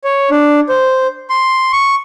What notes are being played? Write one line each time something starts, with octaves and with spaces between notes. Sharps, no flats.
C#5
D4
C5
C6
C#6